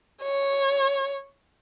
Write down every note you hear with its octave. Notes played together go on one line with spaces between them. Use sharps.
C#5